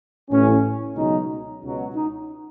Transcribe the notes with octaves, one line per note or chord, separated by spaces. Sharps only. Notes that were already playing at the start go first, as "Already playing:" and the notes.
A1 A2 E3 C#4
C#2 B2 F#3 D#4
C#2 B2 F#3
D#4